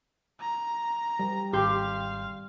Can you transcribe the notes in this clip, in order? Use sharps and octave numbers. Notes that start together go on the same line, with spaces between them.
A#5
G3
G#1 G4 F5 C6 G6